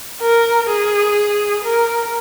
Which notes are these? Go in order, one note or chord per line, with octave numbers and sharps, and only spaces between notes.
A#4
G#4
A#4